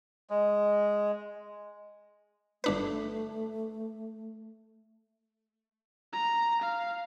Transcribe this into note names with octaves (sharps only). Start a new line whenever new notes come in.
G#3
G1 A3 D4 B4
A#5
F5